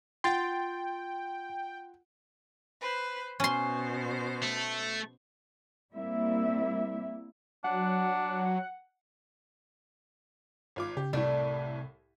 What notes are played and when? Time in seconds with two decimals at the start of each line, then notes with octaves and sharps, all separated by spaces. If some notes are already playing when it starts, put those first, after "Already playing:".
0.24 F4 F#5 G5 C6 A6
2.80 B4 C5
3.40 B2 C#4 C5 C6
4.43 A3
5.93 G3 A#3 C4 E4 E5
7.64 F#3 D4 F#5
10.76 G#1 F4 D6
10.97 C#3 G4
11.13 C2 A2 C3 A3 D5